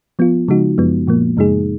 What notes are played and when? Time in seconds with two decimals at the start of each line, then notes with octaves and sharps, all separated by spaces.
0.19 F3 B3 F4
0.48 C#3 F3 G#3 D#4 F#4
0.78 F#2 F3 G#3 B3
1.08 A#2 F3 A#3
1.37 F#2 C#3 G#3 D#4 G#4